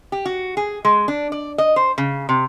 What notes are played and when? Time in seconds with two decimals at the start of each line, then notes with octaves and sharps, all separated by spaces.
0.12 G4
0.25 F#4
0.57 G#4
0.85 G#3
1.08 D4
1.32 D5
1.58 D#5
1.76 C5
1.98 C#3
2.29 C3